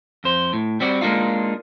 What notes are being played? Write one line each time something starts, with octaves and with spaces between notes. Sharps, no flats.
F2 C5
A2
G3 C4 F#4 D5
G#3 A#3 D4 D#4 F4